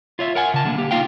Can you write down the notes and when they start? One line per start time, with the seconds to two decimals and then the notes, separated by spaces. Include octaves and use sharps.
0.19 F4 C#5 E5
0.35 A#4 F#5 G#5
0.54 C#3 A5
0.65 D3 G#3 A#3
0.78 A#3 G4
0.91 A#3 D#4 F4 F5 G5